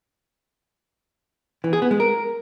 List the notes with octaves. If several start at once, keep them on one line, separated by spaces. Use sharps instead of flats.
E3
G#4
B3
G#3
A#4